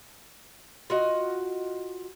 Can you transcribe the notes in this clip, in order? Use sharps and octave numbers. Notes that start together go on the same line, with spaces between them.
F4 F#4 D#5